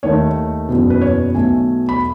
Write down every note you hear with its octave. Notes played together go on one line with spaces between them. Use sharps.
D#2 D#3 A3 C#5
F#1 E2 B2
B4
C#5
B1 B2 A3 G#5
B5